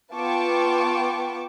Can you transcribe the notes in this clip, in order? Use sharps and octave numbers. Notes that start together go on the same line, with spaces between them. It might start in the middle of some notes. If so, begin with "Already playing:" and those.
B3 F4 G5 A5 C#6 D6